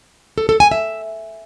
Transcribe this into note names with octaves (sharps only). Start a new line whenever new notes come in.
A4
A4
G#5
E5